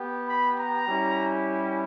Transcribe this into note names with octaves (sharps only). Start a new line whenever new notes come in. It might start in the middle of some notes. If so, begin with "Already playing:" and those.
Already playing: B3 G4
B5
A#5
G3 C#4 E4 G4